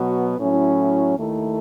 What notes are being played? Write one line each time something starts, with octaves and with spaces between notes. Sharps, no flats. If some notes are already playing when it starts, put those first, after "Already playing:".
Already playing: B2 F#3 B3 F#4
A2 F#3 C#4 E4
D#2 D#3 A3 E4